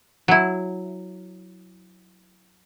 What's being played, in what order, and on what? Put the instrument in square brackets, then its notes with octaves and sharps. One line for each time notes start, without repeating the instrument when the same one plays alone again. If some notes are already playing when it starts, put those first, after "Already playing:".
[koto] F#3 E4